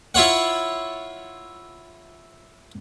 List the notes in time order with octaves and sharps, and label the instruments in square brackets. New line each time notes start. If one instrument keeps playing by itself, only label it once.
[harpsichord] E4 F4 C#5 F#5